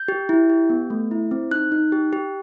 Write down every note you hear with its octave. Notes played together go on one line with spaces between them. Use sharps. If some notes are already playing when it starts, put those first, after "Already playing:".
Already playing: G6
G4
E4
G4
B3
A3
E4
C4
D#4 F#6
D#4
G4
G4